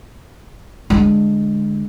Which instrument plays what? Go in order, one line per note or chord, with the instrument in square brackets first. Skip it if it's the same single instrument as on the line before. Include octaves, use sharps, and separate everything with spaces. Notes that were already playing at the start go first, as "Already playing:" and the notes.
[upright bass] D3 G#3